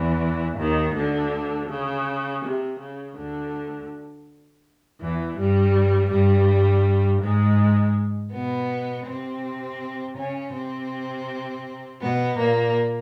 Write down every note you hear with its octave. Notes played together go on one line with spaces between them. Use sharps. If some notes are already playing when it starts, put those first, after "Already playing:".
Already playing: E2 E3
D#2 D#3
D2 D3
C#3
C3
C#3
D2 D3
E2 E3
G2 G3
G2 G3
G#2 G#3
B2 B3
C3 C4
C#3 C#4
C3 C4
B2 B3
A#2 A#3